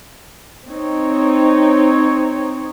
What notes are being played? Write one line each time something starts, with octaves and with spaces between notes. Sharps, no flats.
C4 D#4 C#5